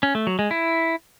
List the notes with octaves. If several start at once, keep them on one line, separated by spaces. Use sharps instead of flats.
C#4
A3
F#3
G#3
E4